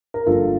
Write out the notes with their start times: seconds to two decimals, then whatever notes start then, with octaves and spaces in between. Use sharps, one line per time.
0.14 A#4
0.26 G1 G2 F3 A#3 F4 A4